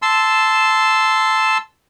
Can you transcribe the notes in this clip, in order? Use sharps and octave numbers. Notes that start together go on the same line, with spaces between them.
A5 C6 E6